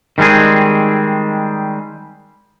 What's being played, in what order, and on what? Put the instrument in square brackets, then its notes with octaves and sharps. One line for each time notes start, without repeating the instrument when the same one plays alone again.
[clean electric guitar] D#3 G3 G#3 C4 G#4